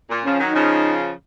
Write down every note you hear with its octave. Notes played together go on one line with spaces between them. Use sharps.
A#2
C#3 F3 C#4
D#3 F#3
D#4
C#3 F3